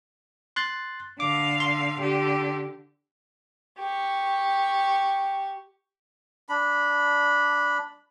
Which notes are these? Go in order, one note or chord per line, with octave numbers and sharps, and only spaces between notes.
C6 F#6 A6
D3 F5 D6
C6
D3 G4
G4 C#6
D4 B5